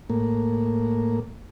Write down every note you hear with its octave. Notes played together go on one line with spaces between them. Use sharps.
A2 A#3